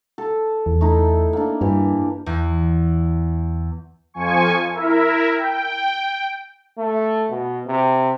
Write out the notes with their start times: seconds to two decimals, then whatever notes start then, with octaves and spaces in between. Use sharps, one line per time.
0.18 A4
0.66 E2
0.81 A3 D#4 E4
1.33 A#3 D4
1.61 G2 E3 G4
2.26 E2
4.14 F2 F3 G#5 C#6
4.72 E4 A#4 E5
5.35 G5
6.78 A3
7.31 B2
7.67 C3